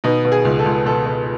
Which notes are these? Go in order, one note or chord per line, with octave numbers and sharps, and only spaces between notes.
B2 D#4
B2
G#4
C#2
A4
C#2
B2 A4
B2